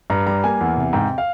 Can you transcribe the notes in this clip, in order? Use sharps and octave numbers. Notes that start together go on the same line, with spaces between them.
G2 A#5
G3 A#5
A#3 G#5
E2
C3
G#2 G5
F5